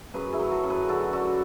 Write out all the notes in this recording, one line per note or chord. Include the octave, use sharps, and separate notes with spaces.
F#2 G#4 B4
E4 G#4
F#3
F#4 A4
F#2
G#4 B4
D3 F#4 A4
D3 F#4 A4